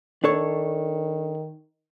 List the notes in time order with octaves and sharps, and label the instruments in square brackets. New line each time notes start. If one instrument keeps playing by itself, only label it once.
[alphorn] D#3 [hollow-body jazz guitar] D4 A4 C#5